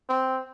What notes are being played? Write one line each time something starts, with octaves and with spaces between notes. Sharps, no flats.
C4